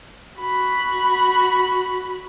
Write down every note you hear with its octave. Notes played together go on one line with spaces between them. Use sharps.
F#4 B5